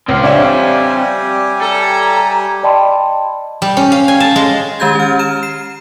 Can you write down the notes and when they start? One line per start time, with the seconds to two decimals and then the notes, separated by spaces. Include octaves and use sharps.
0.09 C#2 C4 F5
0.23 G3 D4 G4 C#5 E5 G#5
1.61 A4 A#5
2.63 D5 D#5 G5 A5 B5 C6
3.62 G3
3.77 C#4
3.92 F5
4.08 G#5
4.20 A5
4.36 G#3
4.80 D#3 G#3 G4 G6 G#6
4.95 C#4 F6
5.19 A#5 F6 E7
5.43 C7 E7